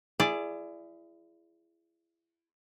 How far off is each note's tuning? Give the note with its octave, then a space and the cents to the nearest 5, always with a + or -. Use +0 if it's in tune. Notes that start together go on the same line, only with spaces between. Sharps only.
E4 +30 G#4 +0 D5 +0